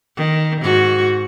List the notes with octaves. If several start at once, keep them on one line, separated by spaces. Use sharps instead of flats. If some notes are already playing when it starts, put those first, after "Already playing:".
D#3
G#2 F#4